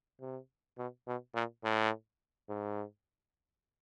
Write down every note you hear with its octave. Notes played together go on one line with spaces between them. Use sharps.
C3
B2
B2
A#2
A2
G#2